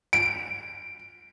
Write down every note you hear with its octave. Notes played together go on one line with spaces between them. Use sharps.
D7